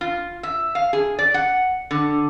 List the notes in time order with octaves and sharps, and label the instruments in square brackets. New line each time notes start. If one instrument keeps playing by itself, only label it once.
[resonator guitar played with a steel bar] F4
E5
F5
G#4
D5
F#5
D3